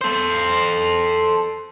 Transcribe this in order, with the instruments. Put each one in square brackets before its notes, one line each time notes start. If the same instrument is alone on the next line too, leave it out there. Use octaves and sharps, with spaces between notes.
[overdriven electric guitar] A4 C5